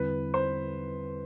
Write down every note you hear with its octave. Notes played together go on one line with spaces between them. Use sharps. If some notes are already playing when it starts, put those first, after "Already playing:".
Already playing: E2 D3 G3 C4 E4 B4
C5